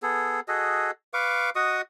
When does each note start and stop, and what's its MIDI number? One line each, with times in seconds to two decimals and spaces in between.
0.03 0.40 59
0.03 0.40 68
0.03 0.40 69
0.48 0.91 66
0.48 0.91 68
0.48 0.91 69
0.48 0.91 75
1.13 1.50 71
1.13 1.50 77
1.13 1.50 85
1.13 1.50 86
1.56 1.81 66
1.56 1.81 75
1.56 1.81 85
1.56 1.81 87